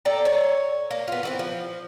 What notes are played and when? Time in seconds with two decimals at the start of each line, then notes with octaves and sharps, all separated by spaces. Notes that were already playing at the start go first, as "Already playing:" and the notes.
0.05 A4 D5 G5 A#5
0.25 C#5
0.91 A#3
1.08 B3 F4
1.23 E3 A3 C4
1.39 F3